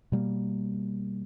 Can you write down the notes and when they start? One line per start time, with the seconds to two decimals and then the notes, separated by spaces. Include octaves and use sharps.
0.12 B2 G3 A#3